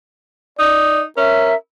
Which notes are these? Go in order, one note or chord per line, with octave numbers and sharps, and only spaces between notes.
D#4 D5
C#4 A#4 E5